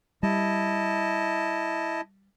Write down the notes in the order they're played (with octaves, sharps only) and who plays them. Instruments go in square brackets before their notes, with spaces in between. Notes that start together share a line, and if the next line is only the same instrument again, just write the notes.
[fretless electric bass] G3 [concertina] E4 D#5 A5